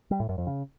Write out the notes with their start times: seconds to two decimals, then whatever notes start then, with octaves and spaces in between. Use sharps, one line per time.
0.11 G3
0.20 A2
0.29 F#2
0.38 F2
0.47 C#3